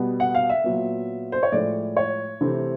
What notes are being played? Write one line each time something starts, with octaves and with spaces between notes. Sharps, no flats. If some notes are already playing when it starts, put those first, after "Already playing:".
Already playing: B2 G3 B3
F#5
F5
E5
A#2 F#3 B3
C5
C#5
A2 F3 G#3 D5
C#5
C3 E3 A3 C4